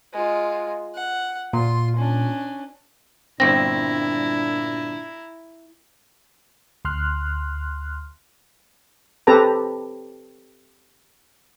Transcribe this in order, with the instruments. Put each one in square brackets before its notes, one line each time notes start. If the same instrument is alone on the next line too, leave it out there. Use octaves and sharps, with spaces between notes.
[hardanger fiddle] G#3 F4
F#5
[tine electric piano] A#2 [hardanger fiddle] F4 C6
[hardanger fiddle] C#4 D4
[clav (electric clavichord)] G1 C4 [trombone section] A#2 D4 [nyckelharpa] E4 A#5 [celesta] A#6
[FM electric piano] D2 C6 F6 F#6
[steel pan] C4 G4 A4 B4 A5 A#5